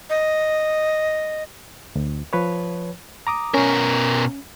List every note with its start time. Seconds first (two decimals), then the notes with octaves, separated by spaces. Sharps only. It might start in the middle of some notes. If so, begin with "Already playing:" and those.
0.10 D#5
1.96 D2
2.33 F3 B4 C#5
3.27 A#5 D6 D#6
3.54 B2 C#4 A#4